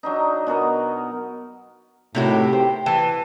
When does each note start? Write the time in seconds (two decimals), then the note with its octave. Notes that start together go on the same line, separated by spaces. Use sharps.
0.03 F#3 D4 D#4
0.47 B2 F#4 A#4 D#5
2.15 A2 C3 D#4 E4 F#4 G4 A#4
2.53 C5 G5
2.86 E3 A5